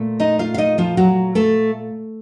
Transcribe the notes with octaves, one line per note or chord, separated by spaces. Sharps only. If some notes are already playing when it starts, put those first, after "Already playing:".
Already playing: A#2 A3
D#4 D#5
F4 F5
F5
D#4 D#5
F3 F4
F#3 F#4
A3 A4